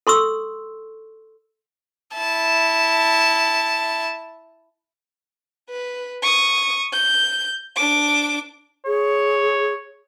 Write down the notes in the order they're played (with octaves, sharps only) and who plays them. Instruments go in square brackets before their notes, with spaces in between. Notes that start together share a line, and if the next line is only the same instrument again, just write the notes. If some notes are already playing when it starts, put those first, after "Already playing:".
[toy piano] A4 C6 C#6 E6
[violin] E4 A5
B4
C#6 D#6
G6
D4 D6
[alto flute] G#4 [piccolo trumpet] C#5